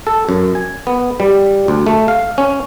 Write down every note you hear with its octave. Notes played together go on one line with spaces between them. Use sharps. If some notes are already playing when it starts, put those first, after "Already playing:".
A4
F#2
G#5
B3
G3
D2
A3
F5
C#4